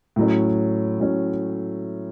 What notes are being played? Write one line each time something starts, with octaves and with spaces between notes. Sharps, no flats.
A2 F#3 C#4
A2 F#3 C#4